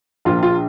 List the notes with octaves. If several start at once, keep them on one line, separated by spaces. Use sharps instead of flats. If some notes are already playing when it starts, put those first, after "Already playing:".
A#1 A#2 F3 F4
F4